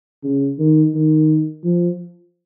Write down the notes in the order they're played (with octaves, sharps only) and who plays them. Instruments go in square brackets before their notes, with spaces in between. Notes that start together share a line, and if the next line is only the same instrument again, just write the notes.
[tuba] C#3
D#3
D#3
F3